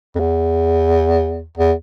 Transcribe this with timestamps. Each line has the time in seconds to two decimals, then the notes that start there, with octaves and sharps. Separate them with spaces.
0.15 F2
0.20 E2
1.57 E2